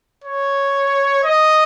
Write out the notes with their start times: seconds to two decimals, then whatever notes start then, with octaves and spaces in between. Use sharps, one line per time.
0.24 C#5
1.24 D#5